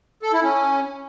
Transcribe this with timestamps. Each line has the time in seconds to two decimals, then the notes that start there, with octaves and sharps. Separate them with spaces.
0.22 A4
0.33 E4
0.43 C#4